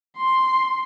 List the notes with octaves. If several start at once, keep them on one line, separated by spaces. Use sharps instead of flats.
C6